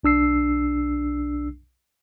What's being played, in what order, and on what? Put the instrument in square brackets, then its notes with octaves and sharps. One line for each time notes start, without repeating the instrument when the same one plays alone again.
[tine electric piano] B1 D4 E6 C7